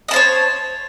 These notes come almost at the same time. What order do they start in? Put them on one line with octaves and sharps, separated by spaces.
D#5 A5 C5 C#5